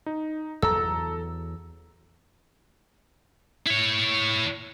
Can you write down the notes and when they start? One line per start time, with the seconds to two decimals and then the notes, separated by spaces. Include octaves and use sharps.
0.06 D#4
0.62 E2 F#3 A4 A#5 E6
3.67 E4 C#5